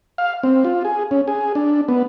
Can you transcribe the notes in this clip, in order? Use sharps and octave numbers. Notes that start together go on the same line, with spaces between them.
F5
C4
F4
G#4
C#4
G#4
D4
B3